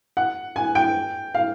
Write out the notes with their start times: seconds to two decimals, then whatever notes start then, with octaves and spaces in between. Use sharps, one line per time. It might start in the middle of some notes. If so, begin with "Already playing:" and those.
0.17 F#5
0.56 G#5
0.75 G5
1.35 F5